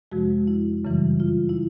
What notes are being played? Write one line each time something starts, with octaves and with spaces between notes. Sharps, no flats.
F2 C3 F3 G#3 F#4
E4
F#2 C#3 E3 G3
F4
E4